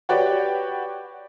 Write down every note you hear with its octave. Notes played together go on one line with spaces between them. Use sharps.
F#4 G4 B4 C#5 D5 G5